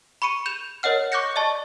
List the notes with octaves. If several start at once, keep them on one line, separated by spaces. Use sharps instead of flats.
B5 C#6 C#7 D#7
G6 E7 F7
A#4 C#5 D#5 F#5 F6
C#6 D6 F#6 G6 A#6 C#7
D5 D#5 A5 C#6